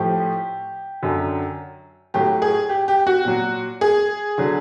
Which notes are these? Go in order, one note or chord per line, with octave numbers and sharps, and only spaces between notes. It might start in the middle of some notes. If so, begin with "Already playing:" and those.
Already playing: A2 F3 G4
F#2 D3 F#3
A2 F#3 G4
G#4
G4
G4
F#4
A#2 F#3
G#4
D3 F#3